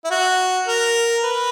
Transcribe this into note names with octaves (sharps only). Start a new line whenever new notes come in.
E4
F#4
A#4
B4